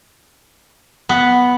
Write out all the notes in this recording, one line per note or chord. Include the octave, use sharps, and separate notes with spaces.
B3